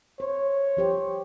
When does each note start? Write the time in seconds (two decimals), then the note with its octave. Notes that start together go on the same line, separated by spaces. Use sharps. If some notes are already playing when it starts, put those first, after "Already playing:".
0.20 C5 C#5
0.77 F3 G4 C5